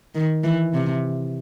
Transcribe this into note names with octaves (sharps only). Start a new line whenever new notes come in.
D#3
E3
C3